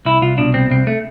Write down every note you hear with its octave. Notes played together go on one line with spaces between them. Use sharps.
C2 E4
C2 F4
B2 D4
C2 C4
C2 C4
A3